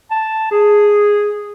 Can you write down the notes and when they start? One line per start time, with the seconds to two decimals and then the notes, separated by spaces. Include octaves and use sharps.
0.11 A5
0.51 G#4